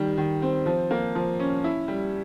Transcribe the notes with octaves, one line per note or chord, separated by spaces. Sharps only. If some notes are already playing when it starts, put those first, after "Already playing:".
Already playing: D#3 G3
D#3
C4
F3
A#3
F3
C#4
E4
G3